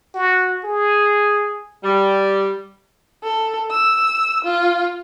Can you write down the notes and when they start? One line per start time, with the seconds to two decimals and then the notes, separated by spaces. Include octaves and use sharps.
0.15 F#4
0.64 G#4
1.84 G3
3.23 A4
3.71 E6
4.45 F4